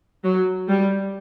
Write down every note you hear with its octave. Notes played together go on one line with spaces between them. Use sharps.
F#3
G3